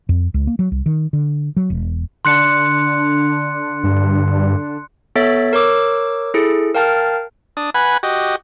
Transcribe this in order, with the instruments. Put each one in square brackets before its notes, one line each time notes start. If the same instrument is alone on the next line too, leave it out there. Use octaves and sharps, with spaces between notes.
[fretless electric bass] F2
C#2
A#3
F#3
C2
D#3
D3
F#3
E1
[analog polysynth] D3 D4 [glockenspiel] C6 F#6 C#7
[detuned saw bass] G2
[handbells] B3 A4 C#5 E5 A6 B6
A#4 C#5 D6 E6
E4 G#4 A4 C#7
A#4 F5 G5 A5 F6 A6
[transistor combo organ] D4 D#6
B4 F#5 G#5 B5
F#4 G4 D#5